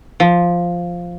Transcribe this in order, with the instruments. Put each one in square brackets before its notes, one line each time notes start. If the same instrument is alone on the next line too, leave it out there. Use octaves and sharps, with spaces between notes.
[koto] F3